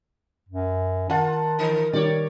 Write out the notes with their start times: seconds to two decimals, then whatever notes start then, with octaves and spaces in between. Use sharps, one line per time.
0.48 F#2
1.10 D#3 F4 F#5 A5
1.59 E3 D#4 A#4
1.93 D#3 G3 C#5 D5